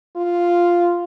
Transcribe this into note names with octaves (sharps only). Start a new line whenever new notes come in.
F4